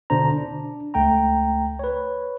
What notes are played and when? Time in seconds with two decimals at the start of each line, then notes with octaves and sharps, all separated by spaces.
0.10 B2 D3 D4 C5 A#5
0.38 D4
0.94 C#2 A3 G5 A#5
1.79 B4 C#5